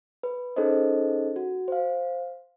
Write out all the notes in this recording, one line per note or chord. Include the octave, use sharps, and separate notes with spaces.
B4
C#4 D#4 G#4 A4 C5 D#5
F#4
C5 F5